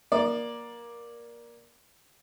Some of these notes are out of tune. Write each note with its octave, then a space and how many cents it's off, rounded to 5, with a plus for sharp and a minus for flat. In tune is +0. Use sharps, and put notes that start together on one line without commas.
A#3 +15 D5 +0